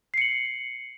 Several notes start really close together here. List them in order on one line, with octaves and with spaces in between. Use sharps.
C7 C#7 F#7